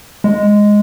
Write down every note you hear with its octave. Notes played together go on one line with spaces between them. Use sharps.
G#3